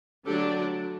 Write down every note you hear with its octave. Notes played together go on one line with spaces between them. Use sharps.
D3 F#3 A3 D4 G4 A4